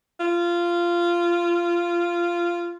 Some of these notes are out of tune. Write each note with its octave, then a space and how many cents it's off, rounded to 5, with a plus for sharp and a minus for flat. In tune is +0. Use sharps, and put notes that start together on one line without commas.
F4 -15